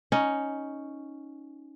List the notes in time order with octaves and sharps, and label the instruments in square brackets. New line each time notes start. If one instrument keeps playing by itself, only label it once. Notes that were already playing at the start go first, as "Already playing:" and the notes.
[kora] C#4 D#4